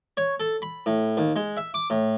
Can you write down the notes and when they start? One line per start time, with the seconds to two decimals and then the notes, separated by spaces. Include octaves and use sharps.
0.17 C#5
0.40 A4
0.62 B5
0.86 A2
1.17 D#2
1.36 G#3
1.57 E5
1.74 D6
1.90 A2